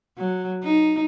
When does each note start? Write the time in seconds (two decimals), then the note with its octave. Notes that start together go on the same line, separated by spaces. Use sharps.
0.18 F#3
0.63 D#4